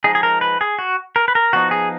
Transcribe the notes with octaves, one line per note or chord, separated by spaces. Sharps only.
F3 G#3 D#4 G#4
G#4
A#4
B4
G#4
F#4
A#4
B4
A#4
F3 B3 D#4 F#4
G#4